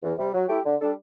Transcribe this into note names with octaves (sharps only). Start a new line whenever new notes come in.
E2
C3 G3
F#3
A3 E4 G4
D3
G3 D4 A4